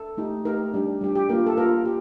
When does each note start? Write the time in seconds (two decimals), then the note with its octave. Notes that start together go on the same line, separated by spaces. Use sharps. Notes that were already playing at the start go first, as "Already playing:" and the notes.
Already playing: A4
0.17 A3 D#4 G4
0.45 A3 D#4 G4 A#4
0.74 G3 D4 G4
1.01 G3 D4 G4
1.15 G4
1.29 A#3 F4 A#4
1.46 A4
1.57 A#3 F4 A#4
1.85 G4